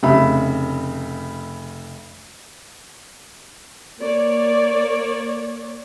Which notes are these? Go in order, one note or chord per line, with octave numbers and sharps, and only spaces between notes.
F1 C#3 E5 B5
A#3 C#5 D5